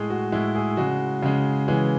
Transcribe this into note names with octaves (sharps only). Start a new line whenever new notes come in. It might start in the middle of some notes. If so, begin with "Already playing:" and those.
Already playing: A2 G#3 G#4
F#4
A2 G#3 E4
G#4
C#3 G#3 F#4
C#3 G#3
C#3 E3 G#3